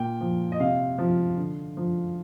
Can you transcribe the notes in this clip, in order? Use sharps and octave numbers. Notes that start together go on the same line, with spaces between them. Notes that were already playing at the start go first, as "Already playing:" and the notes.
Already playing: A#2 G5
F3
D#5
C3 F5
F3
D3
F3